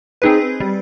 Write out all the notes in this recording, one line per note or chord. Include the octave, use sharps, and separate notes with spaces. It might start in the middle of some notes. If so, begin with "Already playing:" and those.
C4 D#4 G#4 B4
G3